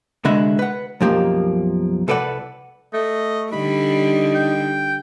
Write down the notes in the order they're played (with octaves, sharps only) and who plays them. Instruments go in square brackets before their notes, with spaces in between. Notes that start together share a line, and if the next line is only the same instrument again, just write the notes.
[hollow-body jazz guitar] C2 D3 G#3 F#4 E5 B5
B4 F#5
B1 F#2 F3 A#3 G4
C2 A4 B4 D5 F#5
[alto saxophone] A3 [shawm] D#5
[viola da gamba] D3 G3 [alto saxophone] D#4 [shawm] B5
[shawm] G5